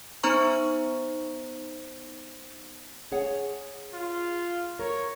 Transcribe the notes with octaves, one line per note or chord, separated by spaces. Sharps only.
B3 D#4 C5 A#5 C#6
G#4 C#5 F#5
F4
A#4 C#5